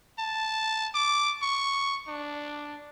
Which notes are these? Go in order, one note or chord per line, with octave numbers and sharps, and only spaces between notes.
A5
D6
C#6
D4